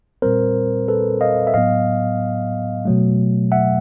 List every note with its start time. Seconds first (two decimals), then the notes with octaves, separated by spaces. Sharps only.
0.22 A#2 G3 C4 A#4 C5
0.88 A4 B4
1.21 D#5 F5
1.47 E5
1.54 A2 F#3 B3 D#5 F5
2.85 B2 F#3 A3
3.52 E5 F#5